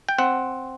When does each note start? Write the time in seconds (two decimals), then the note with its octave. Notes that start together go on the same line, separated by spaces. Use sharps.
0.09 G5
0.18 C4 F#5